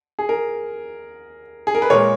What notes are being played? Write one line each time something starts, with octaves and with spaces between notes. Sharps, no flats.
G#4
A#4
G#4
A#4
B4
A#2 G#3 A#4 C#5